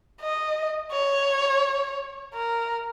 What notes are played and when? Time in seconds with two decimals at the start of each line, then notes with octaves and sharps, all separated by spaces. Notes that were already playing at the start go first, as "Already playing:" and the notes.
0.21 D#5
0.92 C#5
2.34 A#4